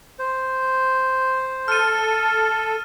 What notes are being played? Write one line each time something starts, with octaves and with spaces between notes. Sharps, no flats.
C5
A4 F6 D#7